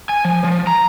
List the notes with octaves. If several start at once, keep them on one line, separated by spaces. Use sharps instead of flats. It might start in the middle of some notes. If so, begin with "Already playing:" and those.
G#5
F3
F3
A#5